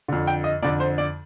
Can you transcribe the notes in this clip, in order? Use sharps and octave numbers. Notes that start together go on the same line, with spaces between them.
F2 D3
G5
D#5
F2 D3 D5
C5
D5